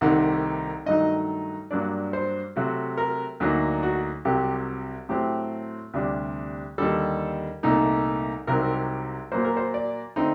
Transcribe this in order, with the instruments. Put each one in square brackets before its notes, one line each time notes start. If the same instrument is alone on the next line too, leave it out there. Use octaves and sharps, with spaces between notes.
[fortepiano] C2 C3 D#3 A3 D#4 F#5
G2 D#3 F#3 A3 D#4 D#5
G2 F#3 A#3 D4 D5
C5
C3 F#3 A3
A#4
D2 D3 F#3 A#3 D#4
F#4
C2 C3 F#3 G4
A2 F#3 A3 C4 G4
D2 C3 G3 D4
D#2 D3 G3 A4
C2 A#2 A3 D#4
C2 C3 F#3 C4 D#4 A#4
A#2 F#3 A#3 C5
A#4
C5
D5
D3 A3 C4 D#4